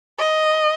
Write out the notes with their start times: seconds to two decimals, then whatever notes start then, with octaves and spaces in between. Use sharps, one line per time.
0.19 D#5